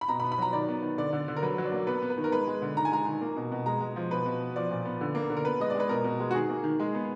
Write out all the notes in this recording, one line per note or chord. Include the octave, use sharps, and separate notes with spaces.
B5
B2 A#5
B5
B3
B5
F#3 A#5
D#3 D5
B3
D#3
D3 D5
D3
D3
A#4
F#3 B4
F#3
D5
A#3
B3 B4
B3
B4
D#3
A#4
G#3 B4
G#3
D3
D#3 A#5
G#5
G#3 A#5
D#3
A#3
B2
B2
G#3 A#5
G#3
F3
B2 B4
B2
B3
F3 D5
A#2
B3
D3
A#3
D3
A#4
B3 B4
G#3 D#5
D5
G#3 B4
B2 A#4
B2
G#3
F#4
D#3 G#4
A#3
D#3
G#3
B3